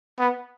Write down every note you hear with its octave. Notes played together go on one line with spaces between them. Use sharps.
B3